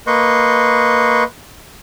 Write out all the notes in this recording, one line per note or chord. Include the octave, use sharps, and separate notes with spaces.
A#3 B4 D#5 C6 C#6 G6